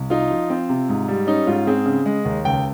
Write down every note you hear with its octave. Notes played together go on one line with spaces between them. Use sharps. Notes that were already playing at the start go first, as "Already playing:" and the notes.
Already playing: C2
D#4 F4
F3
C4
C3
G#2
G3
C#4 D#4
G#2 F4
C4 G#4
C#3
G#3
D#2
C#2 G5